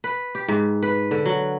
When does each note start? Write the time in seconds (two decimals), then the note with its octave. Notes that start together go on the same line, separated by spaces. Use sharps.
0.04 B4
0.35 G4
0.48 G#2
0.82 B4
1.11 D3
1.26 F#3